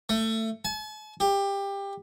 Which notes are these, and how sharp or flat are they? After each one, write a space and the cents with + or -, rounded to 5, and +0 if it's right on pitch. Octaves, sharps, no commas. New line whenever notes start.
A3 +20
A5 -45
G4 +20